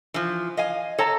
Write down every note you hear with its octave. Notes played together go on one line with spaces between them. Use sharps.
E3 F3
D#5 F5 G#5
A4 C#5 A5 A#5